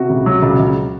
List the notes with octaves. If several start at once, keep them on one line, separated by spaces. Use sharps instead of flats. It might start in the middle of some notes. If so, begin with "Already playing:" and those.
Already playing: C3 F#4
C#2
F#3
C#2
C#2